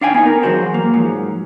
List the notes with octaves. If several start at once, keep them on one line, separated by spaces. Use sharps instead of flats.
D4 F5 G5 G#5
B3 D#4
A#4
E3 F#3 G#3 F#4 C5
A#3
G#2 F3 F#3